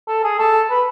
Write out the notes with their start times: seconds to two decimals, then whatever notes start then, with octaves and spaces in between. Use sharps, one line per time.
0.08 A4
0.24 G#4
0.39 A4
0.70 B4